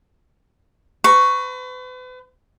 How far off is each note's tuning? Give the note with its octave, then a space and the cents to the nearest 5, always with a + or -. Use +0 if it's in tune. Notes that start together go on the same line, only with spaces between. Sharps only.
B4 +40 A#5 +10 C#6 +0